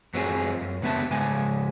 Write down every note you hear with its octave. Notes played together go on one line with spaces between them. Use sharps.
F#2 F#3 C4 F4 G4 G#4
F#2
C#2 D3 B3 E5 A5
G#2 C#3 G#3 G#5